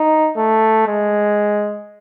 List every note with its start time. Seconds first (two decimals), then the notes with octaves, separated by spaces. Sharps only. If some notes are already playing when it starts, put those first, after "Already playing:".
Already playing: D#4
0.37 A3
0.88 G#3